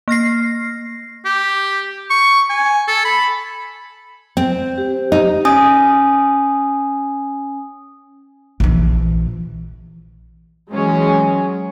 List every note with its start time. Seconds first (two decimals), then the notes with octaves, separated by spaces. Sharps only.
0.08 A#3 F6 A#6 C7
1.26 G4
2.10 C#6
2.50 G#5
2.88 A4
3.05 B5
4.37 C4
4.78 G4 C5
5.12 D#4
5.45 C#4 G#5 D#6
8.60 A#1 E3
10.70 E3 F#3 G#3 C#4